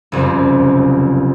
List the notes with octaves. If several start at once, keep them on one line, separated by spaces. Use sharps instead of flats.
F#1 C2 F2